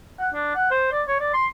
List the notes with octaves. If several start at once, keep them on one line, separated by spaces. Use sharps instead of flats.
F#5
D4
F#5
C5
D5
C#5
D5
C6